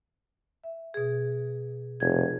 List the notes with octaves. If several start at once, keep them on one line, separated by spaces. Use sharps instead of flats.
E5
B2 G#4
F1 G#4 G#6